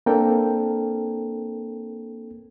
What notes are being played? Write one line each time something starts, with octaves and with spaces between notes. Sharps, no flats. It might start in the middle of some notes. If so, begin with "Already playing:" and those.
A#3 C4 D4 A4 A#4 G5